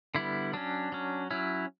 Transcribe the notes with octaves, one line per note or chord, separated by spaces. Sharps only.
D3 G3 B3 E4
F#3 C#4 D4
F#3 C#4
F#3 C#4 E4